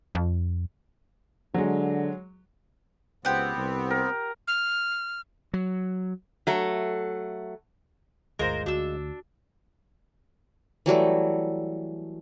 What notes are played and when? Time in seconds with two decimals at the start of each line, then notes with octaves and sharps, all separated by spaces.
0.15 F2
1.54 D3 F#3 G#3
3.25 C#2 B3 C4 G4 F#5
3.56 C2
3.91 A#4
4.48 F6
5.54 F#3
6.47 F#3 A3
8.39 G1 D2 G#3 F4 A#4 C5
8.66 D2 D4 F#4 E6
10.86 E3 F#3 G3 A3